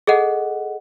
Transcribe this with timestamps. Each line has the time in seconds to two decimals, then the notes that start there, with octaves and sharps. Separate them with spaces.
0.07 G#4 A4 D#5 F#5